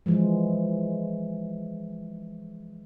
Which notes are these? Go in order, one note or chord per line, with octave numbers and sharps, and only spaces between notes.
E3 F3 G#3